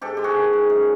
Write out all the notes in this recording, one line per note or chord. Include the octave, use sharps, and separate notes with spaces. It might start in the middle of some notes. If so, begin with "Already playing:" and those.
G#2 G4 A4
G#3 G4
F#4 G#4
D#3
G#2
F#2